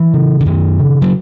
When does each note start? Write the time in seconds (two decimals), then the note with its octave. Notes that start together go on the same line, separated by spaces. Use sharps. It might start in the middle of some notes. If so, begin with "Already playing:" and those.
Already playing: E3
0.14 C#3
0.41 D3
0.45 F#2 D#3
0.79 C#3
1.02 F#3